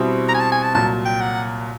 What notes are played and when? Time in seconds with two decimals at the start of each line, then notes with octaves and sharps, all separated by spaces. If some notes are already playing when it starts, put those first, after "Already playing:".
Already playing: B2 G3 C4 E4
0.28 A#5
0.35 G#5
0.40 A5
0.52 G#5
0.63 A5
0.74 C2 A#2 F#3 A5
1.05 G5
1.21 F#5